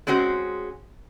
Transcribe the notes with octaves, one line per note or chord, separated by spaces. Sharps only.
G#3 C4 C#4 F#4 G#4